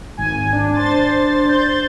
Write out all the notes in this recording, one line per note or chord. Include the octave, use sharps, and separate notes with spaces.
G#1 G#5
D4
C5 C6 A6
G6